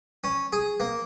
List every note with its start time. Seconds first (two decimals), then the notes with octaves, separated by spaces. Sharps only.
0.24 C#4
0.53 G#4
0.80 A#3